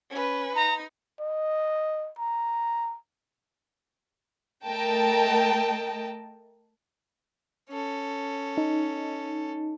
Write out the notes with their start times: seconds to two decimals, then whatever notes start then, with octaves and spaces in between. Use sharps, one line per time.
0.11 C#4 B4
0.56 D#4 A#5
1.20 D#5
2.19 A#5
4.64 A3 A#4 D#5 G5 A5
7.69 C#4 A4
8.58 D#4